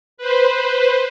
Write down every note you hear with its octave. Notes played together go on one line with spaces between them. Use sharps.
B4 C5